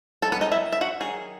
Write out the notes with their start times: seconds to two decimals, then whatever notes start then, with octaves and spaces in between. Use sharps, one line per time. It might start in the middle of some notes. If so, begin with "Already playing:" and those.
0.22 D#3 F#3 A4
0.32 B3 B4
0.41 D#4 D#5
0.52 E4 E5
0.72 E5
0.81 F#4 F#5
1.00 D#3 F#3 G#4